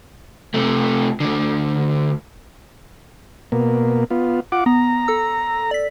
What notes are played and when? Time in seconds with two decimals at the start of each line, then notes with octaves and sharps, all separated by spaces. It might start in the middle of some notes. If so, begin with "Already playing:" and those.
0.54 C3 A3
1.20 D2 D3
3.52 B2 A#3
4.11 B3 F4
4.52 F4 F#5 D6
4.66 B3 A#5
5.08 A4 E6
5.71 D5 B6